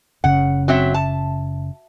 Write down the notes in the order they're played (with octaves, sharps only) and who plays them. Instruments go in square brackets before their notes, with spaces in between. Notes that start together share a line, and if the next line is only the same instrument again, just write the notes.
[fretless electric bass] F#1 C#3 [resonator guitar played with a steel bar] F#5
[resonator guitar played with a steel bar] F#3 C4 E5
A5